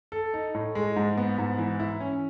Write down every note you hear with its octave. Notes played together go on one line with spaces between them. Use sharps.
A4
D#4
A2
G#3
G#2
B3
G#2
E3
E4
C#4